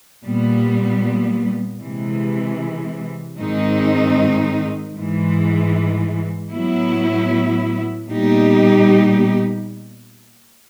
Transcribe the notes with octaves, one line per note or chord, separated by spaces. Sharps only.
A#2 G3 B3
C3 E3 G#3
G#2 D#3 G#3 C4 D#4
G#2 E3 G#3
A2 F#3 B3 E4
A#2 G3 B3 D#4 G4